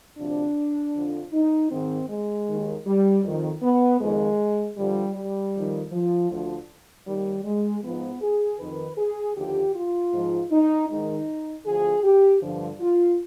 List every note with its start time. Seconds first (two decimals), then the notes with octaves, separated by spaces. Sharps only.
0.18 D2 C3 F3 D4
0.95 F2 D3 F3
1.33 D#4
1.71 G#2 D#3 C4
2.09 G#3
2.48 D#2 D#3
2.87 G3
3.24 F2 D#3
3.63 B3
4.00 F2 D#3 G#3
4.77 G2 D3 F3 G3
5.15 G3
5.54 F2 D#3
5.92 F3
6.30 D2 D3 F3
7.06 D#2 D#3 G3
7.44 G#3
7.83 G#2 F3 B3
8.21 G#4
8.59 F2 D#3 B4
8.98 G#4
9.36 D#2 D3 F3 G4
9.75 F4
10.12 G#2 F3
10.51 D#4
10.89 G#2 D#3 D#4
11.66 D2 D3 F3 G#4
12.04 G4
12.42 G2 D3 F3
12.81 F4